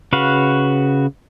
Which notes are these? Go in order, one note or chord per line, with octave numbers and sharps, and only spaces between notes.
C#3 F#4 B4 F5